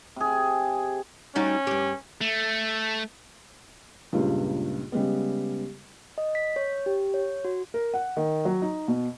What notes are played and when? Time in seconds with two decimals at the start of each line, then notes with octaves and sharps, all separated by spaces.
0.16 C3 G#4
1.35 G3 C#4 D#4 F#4
1.67 G2 G4
2.21 A3
4.12 C#2 G2 A#2 C#3
4.92 C#3 G3 G#3 B3
6.18 D#5
6.35 B6
6.56 C#5
6.86 G4
7.14 C#5
7.45 F#4
7.74 A#4
7.94 F#5
8.17 D#3
8.45 F#3
8.62 D#4
8.88 B2